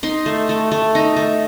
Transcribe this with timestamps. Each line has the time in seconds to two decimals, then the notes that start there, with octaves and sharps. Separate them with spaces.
0.03 D#4 C6
0.26 A3
0.49 A3
0.72 A3
0.95 D#4
1.17 A3